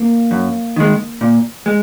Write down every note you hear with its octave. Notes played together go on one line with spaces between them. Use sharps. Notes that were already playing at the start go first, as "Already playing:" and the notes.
Already playing: A#3
F#2
D#3 G#3
A#2
G#3